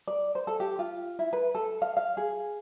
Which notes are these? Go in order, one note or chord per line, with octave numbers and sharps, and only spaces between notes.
D5
C5
A4
G4
F4
E4
B4
A4
F5
F5
G#4